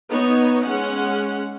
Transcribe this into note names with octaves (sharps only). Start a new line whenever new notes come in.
B3 D#4 C#5
G#3 C#4 F#5